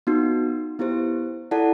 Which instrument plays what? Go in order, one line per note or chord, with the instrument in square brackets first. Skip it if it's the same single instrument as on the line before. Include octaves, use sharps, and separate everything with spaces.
[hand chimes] B3 D#4 F#4
B3 E4 G4 C5
E4 A4 D5 F#5 A5